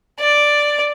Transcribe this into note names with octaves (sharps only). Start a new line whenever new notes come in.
D5